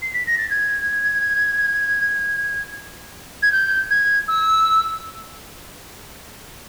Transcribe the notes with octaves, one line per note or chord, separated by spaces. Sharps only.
C7
B6
A#6
A6
G#6
G#6
G6
G#6
E6